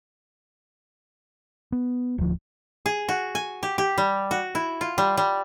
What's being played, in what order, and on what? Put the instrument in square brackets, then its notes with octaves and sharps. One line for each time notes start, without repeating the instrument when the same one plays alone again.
[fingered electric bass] B3
D1 F3
[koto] G#4
F#4
G#5
G4
G4
G3
F#4
E4
F4
G3
G3